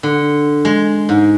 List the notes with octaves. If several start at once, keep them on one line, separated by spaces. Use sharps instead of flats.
D3
G#3
G#2